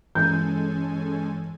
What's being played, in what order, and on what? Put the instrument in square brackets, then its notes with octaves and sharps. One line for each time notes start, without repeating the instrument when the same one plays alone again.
[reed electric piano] G2 E3 [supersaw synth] G#3 A4 G#5 [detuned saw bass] C#4 [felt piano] G6